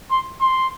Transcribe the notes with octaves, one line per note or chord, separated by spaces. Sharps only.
C6
C6